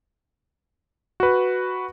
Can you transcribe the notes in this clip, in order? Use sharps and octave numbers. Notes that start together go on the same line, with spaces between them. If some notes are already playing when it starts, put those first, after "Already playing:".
F#4 B4